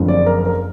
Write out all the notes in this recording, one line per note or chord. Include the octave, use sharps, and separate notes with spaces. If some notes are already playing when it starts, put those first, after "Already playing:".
Already playing: F#1 F2 D3 F3
D5
A#4
A#4